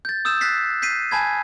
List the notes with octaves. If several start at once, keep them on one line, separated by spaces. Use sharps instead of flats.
G6 A6
D#6 E6 G6 E7
F#6 A6 B6 C7
G6 B6 C7 D#7
G#5 A5 B5 G#6